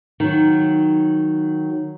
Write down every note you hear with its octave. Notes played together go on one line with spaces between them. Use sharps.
D#3 F#3